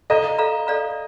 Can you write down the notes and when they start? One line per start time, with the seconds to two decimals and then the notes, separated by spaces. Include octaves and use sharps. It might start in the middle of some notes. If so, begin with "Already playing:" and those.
0.10 A4 D5 D#5 F5 A#5
0.38 A4 D5 F5 A#5
0.67 A4 D5 F5 A#5